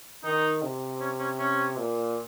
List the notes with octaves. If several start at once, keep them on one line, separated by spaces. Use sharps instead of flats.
D#3 D#4
C3
C#4
C#4
C#4
A#2